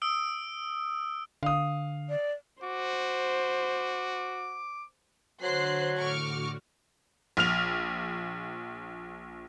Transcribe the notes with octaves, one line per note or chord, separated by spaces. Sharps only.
D#6 E6 D7
D3 F5 D#6
D5
F#4 C5 D6
D3 F#3 C5 F#6 C7
A2 D3 F#4 C#6 D6 F6
A#1 F6 F7